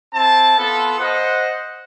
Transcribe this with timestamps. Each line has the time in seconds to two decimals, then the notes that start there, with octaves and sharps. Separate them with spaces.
0.14 C4 E4 A5
0.57 B3 F4 A4
0.99 C5 D#5 F#5